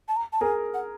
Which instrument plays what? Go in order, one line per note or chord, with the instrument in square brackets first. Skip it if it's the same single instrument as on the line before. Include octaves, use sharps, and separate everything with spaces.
[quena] A5
A#5
A5
[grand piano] G#4 A#4 [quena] G#5
[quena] F#5